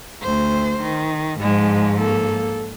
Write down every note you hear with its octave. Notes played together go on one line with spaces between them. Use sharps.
D2 C5
D#3
G#2 F3 G#3
A#3 A4